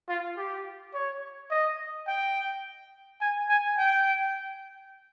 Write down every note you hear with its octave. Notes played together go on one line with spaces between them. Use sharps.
F4
G4
C#5
D#5
G5
G#5
G#5
G5